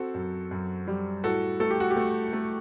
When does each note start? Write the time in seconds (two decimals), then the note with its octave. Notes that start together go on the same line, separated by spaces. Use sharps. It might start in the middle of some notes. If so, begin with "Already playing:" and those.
Already playing: C4 F#4 A4
0.14 F#2
0.51 F#2
0.88 G3
1.23 A2 F#4 A4
1.60 A3 A4
1.70 G4
1.80 F#4
1.91 G4
1.97 A3
2.33 A3